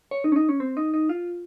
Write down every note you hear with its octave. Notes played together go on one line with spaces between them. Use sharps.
C#5
D#4
C#4
D#4
C#4
C4
D#4
D#4
F4